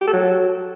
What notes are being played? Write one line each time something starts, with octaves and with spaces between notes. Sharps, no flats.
G4
A4
F#3